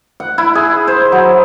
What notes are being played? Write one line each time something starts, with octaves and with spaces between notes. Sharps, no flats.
F#5
E4
G#4
C5
F#3